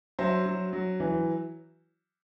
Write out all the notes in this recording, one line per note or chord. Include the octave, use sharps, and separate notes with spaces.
F#3 C5 E5
F#3
F#3
E3